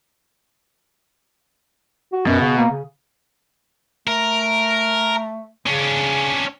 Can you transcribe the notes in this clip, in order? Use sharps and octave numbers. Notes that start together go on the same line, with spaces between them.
F#4
F#2 B2
C#3
A#3
C#3
A3 A#4
C#3 C#4 D4